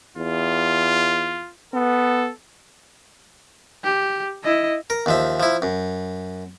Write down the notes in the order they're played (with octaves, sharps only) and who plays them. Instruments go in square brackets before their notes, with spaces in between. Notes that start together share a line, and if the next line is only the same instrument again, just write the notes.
[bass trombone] E2 [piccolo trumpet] F4
[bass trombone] B3 [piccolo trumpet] A4
[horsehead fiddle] G4
E4 D#5
[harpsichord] A#4
D#2 F3 E5
F3 E4
F#2